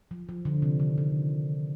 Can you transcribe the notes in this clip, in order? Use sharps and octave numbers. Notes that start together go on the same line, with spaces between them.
F3
F3
D3
C3
D#3
D3